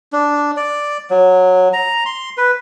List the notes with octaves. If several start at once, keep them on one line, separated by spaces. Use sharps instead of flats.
D4
D5
F#3
A#5
C6
B4